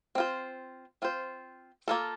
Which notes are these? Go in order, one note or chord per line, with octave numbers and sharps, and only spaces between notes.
C4 F4 C5
C4 F4 C5
A#3 F4 A4